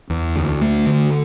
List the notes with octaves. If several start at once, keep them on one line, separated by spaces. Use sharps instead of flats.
E2
D2
A3
D3